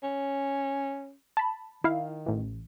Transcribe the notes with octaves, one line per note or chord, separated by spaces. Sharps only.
C#4
A5 B5
D#3 E4 F5
A1 E3